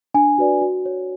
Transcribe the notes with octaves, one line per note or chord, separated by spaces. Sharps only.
D4 G#5
F#4 B4 D5
F#4
C#5